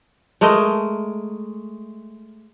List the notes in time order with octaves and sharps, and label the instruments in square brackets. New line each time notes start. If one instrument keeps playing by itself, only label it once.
[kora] G#3 A3 A#4 D#5